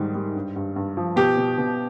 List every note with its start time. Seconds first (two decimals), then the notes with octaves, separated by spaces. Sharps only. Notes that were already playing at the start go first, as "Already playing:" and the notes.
Already playing: G#2 D#3 G3
0.14 G3
0.36 G2
0.56 G2
0.76 G2
0.97 F3
1.16 B2 G4
1.37 B2
1.58 B2